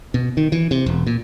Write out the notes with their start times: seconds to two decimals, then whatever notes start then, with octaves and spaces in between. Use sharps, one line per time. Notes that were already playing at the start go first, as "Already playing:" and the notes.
0.14 B2
0.37 D#3
0.52 E3
0.71 C3
0.86 E1
1.06 A#2